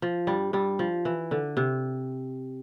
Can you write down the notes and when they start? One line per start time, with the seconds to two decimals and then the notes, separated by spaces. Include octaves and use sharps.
0.02 F3
0.27 G2 G3
0.53 G2 G3
0.79 F3
1.05 E3
1.31 D3
1.57 C3